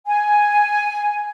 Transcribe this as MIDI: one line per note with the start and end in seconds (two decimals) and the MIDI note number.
0.06 1.29 80